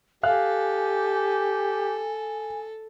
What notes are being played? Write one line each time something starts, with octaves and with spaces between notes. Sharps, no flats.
G4 A4 F5 G#5 F#6